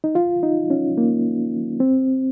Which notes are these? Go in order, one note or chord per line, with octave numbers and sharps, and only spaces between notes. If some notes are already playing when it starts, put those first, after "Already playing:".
D#4
F4
D#4
C#4
A#3
C4